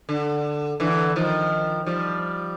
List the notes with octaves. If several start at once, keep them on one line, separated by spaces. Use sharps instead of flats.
D3
D3 E3
D#3 F3
F3 G3